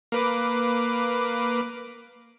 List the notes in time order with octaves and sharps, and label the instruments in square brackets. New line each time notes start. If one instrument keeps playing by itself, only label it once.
[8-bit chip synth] A#3 B4 D6